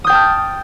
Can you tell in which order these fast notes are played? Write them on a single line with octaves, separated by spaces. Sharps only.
D#6 G6 G5 A5 F6